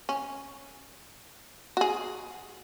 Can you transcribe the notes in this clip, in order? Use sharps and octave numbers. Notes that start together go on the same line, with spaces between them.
C#4
F#4 G#4